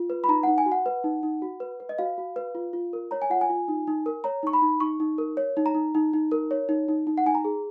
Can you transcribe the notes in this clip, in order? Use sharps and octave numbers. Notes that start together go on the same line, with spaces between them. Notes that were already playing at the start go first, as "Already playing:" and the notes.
Already playing: F4
B4
B5
D#4 A#5
D#4 F#5
G#5
F#4
F#5
B4
D#4
D#4
F#4
B4
B4
D#5
F#4 F5
F#4
B4
F4
F4
A#4
C#5 A#5
G#5
F4 F#5
G#5
F4
D#4
D#4
A#4
C#5 A#5
D#4 C#6
B5
D#4
D#4 C#6
D#4
A#4
C#5
D#4
A#5
D#4
D#4
D#4
A#4
C#5
D#4
D#4
D#4
F#5
D#4 G#5
A#5
G#4